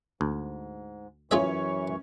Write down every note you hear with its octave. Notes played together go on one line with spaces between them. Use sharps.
D2 G#2
F#2 E3 C#4 F4 G#4 C#5 E5 C#6